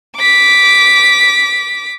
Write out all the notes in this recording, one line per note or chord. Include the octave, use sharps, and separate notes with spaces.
D6 B6